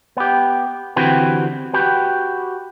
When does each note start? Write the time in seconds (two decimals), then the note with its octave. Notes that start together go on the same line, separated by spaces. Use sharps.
0.17 B3 G4
0.96 D3 E3 C4 F#4 G4 B4
1.73 F#4 G4 B4